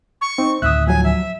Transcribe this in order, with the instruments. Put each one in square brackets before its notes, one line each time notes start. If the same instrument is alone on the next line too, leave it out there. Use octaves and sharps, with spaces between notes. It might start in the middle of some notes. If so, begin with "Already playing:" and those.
[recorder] C#6
[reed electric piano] C4 D#4
[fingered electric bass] D2 A2 D#3 [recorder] E5 [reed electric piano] D#6 F#6
[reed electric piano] F3 F#3 [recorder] G#5
[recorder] E5